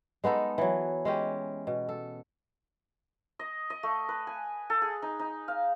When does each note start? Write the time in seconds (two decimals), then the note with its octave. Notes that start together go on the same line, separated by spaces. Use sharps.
0.24 G#3 B3 D#4 A4
0.58 E3 F#3
1.05 G#3 C#4 G4
1.67 B2
1.89 A4
3.39 D#5
3.70 D#5
3.83 A3
4.09 B4
4.27 G#5
4.70 A4
4.82 G#4
5.02 D#4
5.19 D#4
5.48 F5